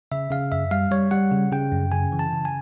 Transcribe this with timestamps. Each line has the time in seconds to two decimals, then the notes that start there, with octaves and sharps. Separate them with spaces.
0.12 C#3 E5
0.31 C#3 F5
0.52 F#2 E5
0.71 G3 F5
0.91 G3 C#5
1.11 G3 F#5
1.32 C#3
1.52 C#3 G5
1.72 F#2
1.92 C#3 G#5
2.12 E3
2.19 A5
2.32 C#3
2.45 G#5